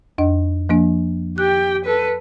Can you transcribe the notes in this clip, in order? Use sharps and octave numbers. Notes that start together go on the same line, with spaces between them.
F2 D4 D#5
F3 A#3 D4
G4 G5 F#6
A4 B4